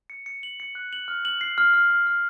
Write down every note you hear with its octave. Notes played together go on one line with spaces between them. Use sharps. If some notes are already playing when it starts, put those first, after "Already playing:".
C#7
C#7
F#7
C#7
F#6
F#7
F6
F#7
C7
F6
F6
F6
F6